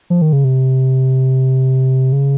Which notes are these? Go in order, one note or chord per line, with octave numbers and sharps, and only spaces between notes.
F3
D#3
C#3
C3
C#3